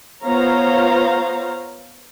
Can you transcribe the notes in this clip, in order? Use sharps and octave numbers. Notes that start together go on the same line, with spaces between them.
B3 F4 C5 C#5 F5 A#5